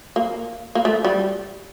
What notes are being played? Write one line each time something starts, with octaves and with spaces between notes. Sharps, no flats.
A#3
A#3
A3
G3